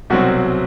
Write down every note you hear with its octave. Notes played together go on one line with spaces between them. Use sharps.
C2 B2 F#3 C4 F#4